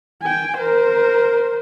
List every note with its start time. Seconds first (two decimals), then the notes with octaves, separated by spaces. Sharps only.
0.22 G5 G#5
0.57 A#4 C5